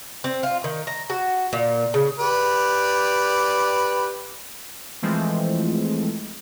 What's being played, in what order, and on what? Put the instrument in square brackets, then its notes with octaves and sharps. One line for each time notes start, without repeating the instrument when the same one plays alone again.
[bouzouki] C4
F4
D#3
A#5
F#4
A#2
C#3
[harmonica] G4 B4 D5
[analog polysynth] E3 F3 G#3 A3 C4